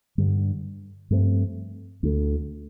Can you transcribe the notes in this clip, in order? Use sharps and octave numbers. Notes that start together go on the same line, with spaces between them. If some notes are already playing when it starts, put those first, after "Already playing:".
G2 D3 G3 D4
G2 F3 A3 C4
D2 D3 A3